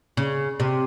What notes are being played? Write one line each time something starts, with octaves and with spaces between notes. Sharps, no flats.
C#3
C3